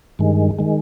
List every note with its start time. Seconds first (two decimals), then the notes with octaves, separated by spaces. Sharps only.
0.19 G2 D#3 G#3
0.59 D#3 G#3